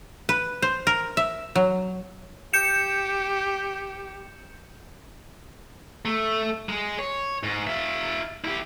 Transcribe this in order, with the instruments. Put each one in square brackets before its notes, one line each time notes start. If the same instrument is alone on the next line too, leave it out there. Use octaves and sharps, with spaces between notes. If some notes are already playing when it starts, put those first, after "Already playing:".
[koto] B4
C5
A#4
E5
F#3
[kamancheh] G4 [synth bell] G6 C#7 E7
[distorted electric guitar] A3
G#3
C#5
G#2
F4 E5
E4 G4